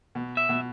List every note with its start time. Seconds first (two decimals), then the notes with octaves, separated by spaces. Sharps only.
0.15 B2
0.37 E5
0.49 B2